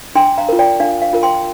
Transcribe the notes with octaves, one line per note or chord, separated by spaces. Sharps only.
D4 G5 C6
F5 A#5
F4 A#4
D5 G5
D4 F5
F5
F4 A#4
G5 C6